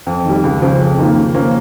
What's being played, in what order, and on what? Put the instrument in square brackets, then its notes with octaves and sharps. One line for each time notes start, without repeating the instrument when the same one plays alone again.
[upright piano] F2
D#3 G3
C#2
C#3 F3
F2
D#3 A#3 F4
C#3
F3 A#3 C#4